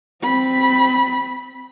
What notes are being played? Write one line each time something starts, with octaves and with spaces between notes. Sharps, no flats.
C4 B5